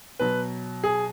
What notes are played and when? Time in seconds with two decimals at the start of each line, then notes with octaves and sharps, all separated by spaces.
0.19 B2 F#3 B4
0.84 G#4